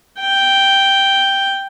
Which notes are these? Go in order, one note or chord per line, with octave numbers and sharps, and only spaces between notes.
G5